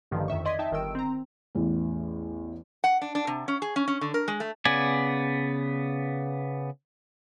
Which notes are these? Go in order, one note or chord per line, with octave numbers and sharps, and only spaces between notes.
A1 G2 D3 D#3 F3
F2 D#3 E5 C#6
D5 D#5 C6 G#6 B6
D#4 E5 G5 A5
G1 D#3 A#4 G5 E6 D7
C4 A#5
A1 E2
F#5
D4
D4
C3
C#4
G#4
C#4
C#4
D3
A#4
G#3
A3
C#3 B3 D5 G#5